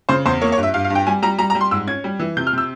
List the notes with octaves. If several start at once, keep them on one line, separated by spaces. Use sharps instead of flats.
C#3 C5
E2 C5
A#3 C#5
C#5
G2
E5
G2 F5
F5
G2
G5
G3 G#5
G3 A#5
G3 A#5
A#5
G3
C6
G#2 E6
C#4 G#6
G3
E3
C3 G6
F6
C3 E6